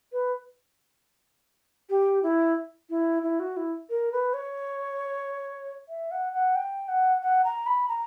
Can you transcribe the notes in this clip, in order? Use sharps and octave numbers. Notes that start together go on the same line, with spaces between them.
B4
G4
E4
E4
E4
F#4
E4
A#4
B4
C#5
E5
F#5
F#5
G5
F#5
F#5
A#5
B5
A#5